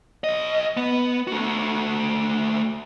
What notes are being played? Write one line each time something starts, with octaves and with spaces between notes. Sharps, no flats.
B1 D#5
B3
A3 F#4